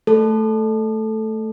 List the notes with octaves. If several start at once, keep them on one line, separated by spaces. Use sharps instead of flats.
A3 A4